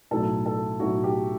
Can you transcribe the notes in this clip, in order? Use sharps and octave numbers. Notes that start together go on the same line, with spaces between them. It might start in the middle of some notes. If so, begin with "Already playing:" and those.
B1 A2 F#3 A3 E4 A4
A4
B1 A2 F#3 A3 E4 F#4
G4